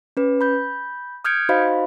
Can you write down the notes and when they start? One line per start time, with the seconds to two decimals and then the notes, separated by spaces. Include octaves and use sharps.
0.17 C#4 B4
0.41 B5 G6
1.24 D#6 F6 G6 G#6 C#7 D7
1.49 D#4 F#4 C5 D#5 F5 B5